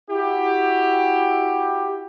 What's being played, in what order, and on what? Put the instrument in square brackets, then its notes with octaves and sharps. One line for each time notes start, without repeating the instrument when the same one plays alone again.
[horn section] E4 F#4 G4